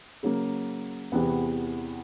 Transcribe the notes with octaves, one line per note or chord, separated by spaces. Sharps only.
C#3 F#3 A#3
E2 C3 E3 B3